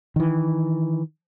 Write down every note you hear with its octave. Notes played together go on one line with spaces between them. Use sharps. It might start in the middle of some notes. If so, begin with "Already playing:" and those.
D#3 E3